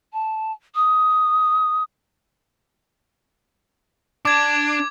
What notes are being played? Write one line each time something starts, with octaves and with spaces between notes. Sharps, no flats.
A5
D#6
D4 D6 G#6